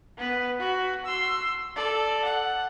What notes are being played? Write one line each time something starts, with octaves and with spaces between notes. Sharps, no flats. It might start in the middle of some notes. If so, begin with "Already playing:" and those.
B3 B4
F#4
C6 E6
A4 D5
F#5